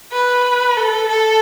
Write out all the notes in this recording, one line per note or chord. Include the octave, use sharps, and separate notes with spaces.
B4
A4
A4